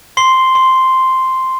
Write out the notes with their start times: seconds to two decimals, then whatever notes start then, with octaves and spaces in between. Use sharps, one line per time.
0.17 C6 C7 G7
0.55 C6